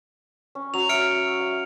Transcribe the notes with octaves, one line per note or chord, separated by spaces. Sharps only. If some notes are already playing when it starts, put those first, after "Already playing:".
C#4
F#3 C#4 F7
E5 F6 C#7 D7
F5